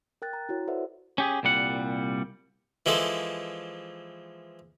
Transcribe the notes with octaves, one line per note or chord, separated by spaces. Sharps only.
A#4 G5 F#6 A6
A#5
E4 F#4 C#5
A4 B4 C5 D5 E5 F#5
C#4 G4 G#4
C2 A#2 G3 F#5
E3 F3 G#3 A4 C5